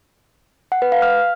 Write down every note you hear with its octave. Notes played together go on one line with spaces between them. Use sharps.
F#5
B4
F5
F6